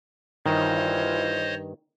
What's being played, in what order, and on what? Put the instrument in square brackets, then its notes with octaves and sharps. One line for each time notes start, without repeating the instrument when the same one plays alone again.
[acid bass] G2 [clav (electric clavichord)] D#3 [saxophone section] E3 F4 [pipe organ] C5 C#5 D#5